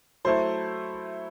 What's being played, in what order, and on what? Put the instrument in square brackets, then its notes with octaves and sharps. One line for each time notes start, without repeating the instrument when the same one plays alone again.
[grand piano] F#3 A3 E4 A4 [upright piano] C5